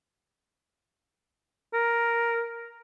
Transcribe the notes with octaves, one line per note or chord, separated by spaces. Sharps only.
A#4